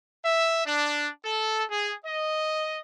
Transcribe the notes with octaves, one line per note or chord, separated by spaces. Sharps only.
E5
D4
A4
G#4
D#5